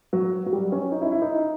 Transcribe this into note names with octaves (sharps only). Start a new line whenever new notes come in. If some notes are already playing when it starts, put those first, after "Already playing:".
F#3
F#3
G3
C#4
D#4
E4
E4
D#4